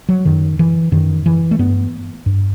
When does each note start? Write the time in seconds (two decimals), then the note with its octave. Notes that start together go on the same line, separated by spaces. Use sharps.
0.09 F#3
0.25 F#2 D#3
0.59 E3
0.92 F#2 D#3
1.26 E3
1.51 A3
1.59 G2 B3
2.26 G2